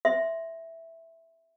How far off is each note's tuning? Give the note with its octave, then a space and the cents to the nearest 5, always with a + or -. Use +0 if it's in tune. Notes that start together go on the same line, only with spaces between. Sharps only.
E5 +0 C6 +0